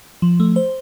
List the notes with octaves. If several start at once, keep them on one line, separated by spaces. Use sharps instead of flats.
F3
A3
C5